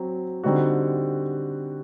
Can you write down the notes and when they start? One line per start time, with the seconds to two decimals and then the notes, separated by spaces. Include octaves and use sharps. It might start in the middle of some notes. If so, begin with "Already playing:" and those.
Already playing: F#3 C4
0.44 D3 G3 C4 D#4 F#4